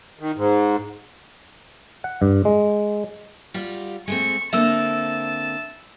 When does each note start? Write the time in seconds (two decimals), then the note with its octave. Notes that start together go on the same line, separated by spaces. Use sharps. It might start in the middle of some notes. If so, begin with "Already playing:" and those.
0.19 D#3
0.36 G#2
2.04 F#5
2.22 G2
2.45 G#3
3.54 G3 F4 F#4
4.08 G#3 A3 C4 C#6
4.53 D3 A#3 C4 E5 A5 E6